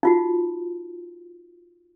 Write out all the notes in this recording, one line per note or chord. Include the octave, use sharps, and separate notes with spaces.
D#4 F4 F#4